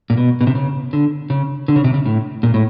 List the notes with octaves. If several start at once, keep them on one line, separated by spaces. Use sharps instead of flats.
A#2
B2
B2
C3
C#3
D3
C#3
D3
C#3
C3
C#3
A2
A#2
A2